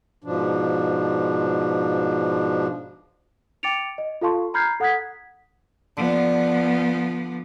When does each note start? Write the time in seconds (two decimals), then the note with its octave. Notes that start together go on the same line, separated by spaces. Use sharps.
0.24 G#2 B2 F3 D4
3.63 G5 D6 A6 C#7 D7 F7
3.98 D#5
4.21 F4 A4 F5 A5 C6 C#6
4.54 A#5 B5 F6 G6 G#6 C7
4.80 A4 F#5 D#6 F#6 G#6 B6
5.97 D3 F3 B3